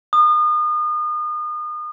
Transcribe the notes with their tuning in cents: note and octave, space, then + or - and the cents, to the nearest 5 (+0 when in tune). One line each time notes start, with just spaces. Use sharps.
D#6 -35